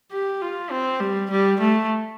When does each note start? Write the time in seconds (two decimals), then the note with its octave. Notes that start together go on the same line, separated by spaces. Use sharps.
0.12 G4
0.41 F4
0.71 C4
1.00 G3
1.30 G3
1.60 A3